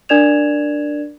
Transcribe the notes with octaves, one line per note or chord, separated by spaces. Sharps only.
D4 A#4 D5 G#6 E7 F7